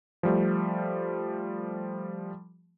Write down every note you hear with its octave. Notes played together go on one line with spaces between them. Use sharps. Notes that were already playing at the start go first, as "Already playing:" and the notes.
F3 G3 A3